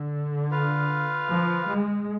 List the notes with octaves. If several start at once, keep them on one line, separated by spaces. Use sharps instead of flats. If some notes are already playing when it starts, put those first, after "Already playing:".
Already playing: D3
F4 B4 F5
F3
G#3